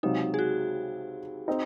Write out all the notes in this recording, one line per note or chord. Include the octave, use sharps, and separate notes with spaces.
C#2 C3 F#3 D#4
G#4
F#4
C4 D#4